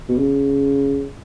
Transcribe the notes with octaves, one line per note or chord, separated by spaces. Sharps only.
B2
C#3